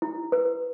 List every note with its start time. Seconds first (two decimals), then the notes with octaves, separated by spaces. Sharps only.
0.02 E4
0.32 B4